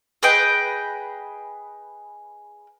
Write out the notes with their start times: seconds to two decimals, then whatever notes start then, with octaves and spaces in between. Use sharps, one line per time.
0.23 G#4 B4 D#5 G5